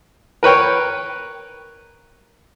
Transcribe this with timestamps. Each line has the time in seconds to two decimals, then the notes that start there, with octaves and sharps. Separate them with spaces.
0.43 A#4 B4 C#5 G5